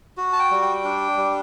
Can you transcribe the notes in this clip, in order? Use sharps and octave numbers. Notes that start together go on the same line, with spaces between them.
F#4
A5
G5
G3
G5
D4
G3